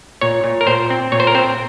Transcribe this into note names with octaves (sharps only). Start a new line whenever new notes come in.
A#2 C#5
A#2
A#4
A#2 C5
C4
A#2 C#5
C5
A#4
C4 C5